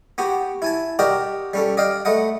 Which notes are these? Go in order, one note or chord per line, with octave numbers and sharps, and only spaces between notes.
B3 F#4 G4
E4 G#5 A5
F#4 G4 A#4 D5 D#5 G5
G3 C#4 A4
D5 D#5 F5 G5
A3 B4 D#5 F#5